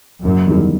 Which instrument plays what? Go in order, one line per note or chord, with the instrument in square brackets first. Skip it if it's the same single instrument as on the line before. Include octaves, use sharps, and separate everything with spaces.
[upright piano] F#1 [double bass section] F#2
[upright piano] E2 C3 D#3 G3